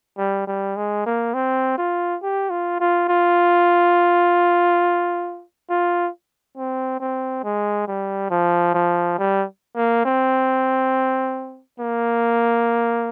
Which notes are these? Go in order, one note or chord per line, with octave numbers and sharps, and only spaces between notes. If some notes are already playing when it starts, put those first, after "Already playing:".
G3
G3
G#3
A#3
C4
F4
G4
F4
F4
F4
F4
C4
C4
G#3
G3
F3
F3
G3
A#3
C4
A#3